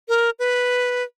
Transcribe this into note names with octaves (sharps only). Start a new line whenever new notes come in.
A#4
B4